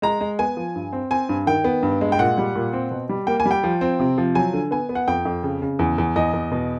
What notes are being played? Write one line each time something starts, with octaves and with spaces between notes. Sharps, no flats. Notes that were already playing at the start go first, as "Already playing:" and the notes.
G#3 A#5
G#3
B3 G#5
F3
G2
C4
C4 G#5
G2
D#3 G5
B3
G2
G#3
G5
A#2 F#5
G3
A#2
C4
B2
G3
A#3 G5
G#5
G3
G5
F3
C4
C3
F3
F#3 G#5
D3
B3 G#5
B3
F#5
F2 G5
F2
C#3
C#3
E2
E2
E2 D#5
E2
B2